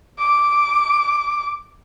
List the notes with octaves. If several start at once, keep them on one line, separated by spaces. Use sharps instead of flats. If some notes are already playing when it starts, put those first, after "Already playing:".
D6